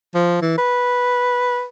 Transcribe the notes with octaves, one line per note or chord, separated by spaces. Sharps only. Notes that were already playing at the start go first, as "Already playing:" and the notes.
F3
E3
B4